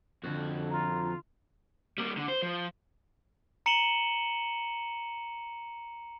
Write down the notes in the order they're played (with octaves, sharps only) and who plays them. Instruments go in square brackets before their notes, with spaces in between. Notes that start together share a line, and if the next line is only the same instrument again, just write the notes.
[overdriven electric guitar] F2 F#4 [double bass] D3
[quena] F4 [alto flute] A#5
[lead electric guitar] G3 A#3
D3
C5
F3
[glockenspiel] A#5 C#7 D#7 E7 F#7 G7